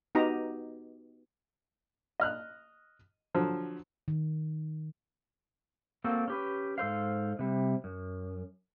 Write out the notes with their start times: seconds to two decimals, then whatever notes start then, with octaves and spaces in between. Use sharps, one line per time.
0.15 B3 D#4 F#4 G4 D#5 A#5
2.20 D#5 F6 F#6
3.34 D3 F3 F#3
4.08 D#3
6.04 A#3 C4 F#4 A4
6.28 C#4 G4 B4
6.78 G#2 A4 C5 F5
7.39 C3 G3
7.84 F#2